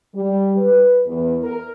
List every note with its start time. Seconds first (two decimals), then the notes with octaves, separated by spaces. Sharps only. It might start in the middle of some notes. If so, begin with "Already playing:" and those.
0.14 G3
0.57 B4
1.06 E2
1.43 A#4